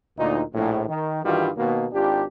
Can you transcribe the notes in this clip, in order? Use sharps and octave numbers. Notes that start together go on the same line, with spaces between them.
D2 A#2 D#4
A#1 A2
D#3
G2 D#3 E3 G3 F4 F#4
D#2 B2 A#3
G#1 D4 F4 G4